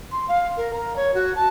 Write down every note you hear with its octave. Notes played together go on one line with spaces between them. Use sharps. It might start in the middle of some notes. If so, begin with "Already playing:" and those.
C6
F5
A#4
A#5
C#5
F#4
A5